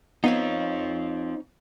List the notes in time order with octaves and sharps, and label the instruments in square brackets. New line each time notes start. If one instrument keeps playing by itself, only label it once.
[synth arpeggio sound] B3 [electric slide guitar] C4 F4 [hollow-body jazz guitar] D#4 B4 C#5